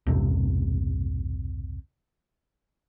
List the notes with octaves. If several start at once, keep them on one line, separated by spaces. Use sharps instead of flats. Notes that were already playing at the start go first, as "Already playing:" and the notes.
B1 E2 G2 C3